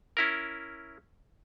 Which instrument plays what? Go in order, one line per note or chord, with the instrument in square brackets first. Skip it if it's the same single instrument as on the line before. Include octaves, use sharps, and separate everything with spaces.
[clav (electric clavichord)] C#4 E4 A#4